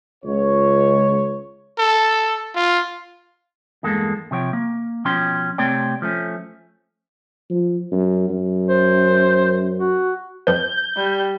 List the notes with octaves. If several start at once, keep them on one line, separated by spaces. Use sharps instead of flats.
C#2 C#5
A4
F4
E2 G2 G#3 A#3 A4
C3 F3 C#5 G5
A#3
B2 F3 C#4 G5 C6
C3 A3 C4 C#5 D5 G5
F3 A3 C#4
F3
F#2
F#2
C5
F#4
F2 F3 B4 G6
G3